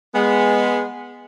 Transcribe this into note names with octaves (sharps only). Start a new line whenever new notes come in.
G#3 B3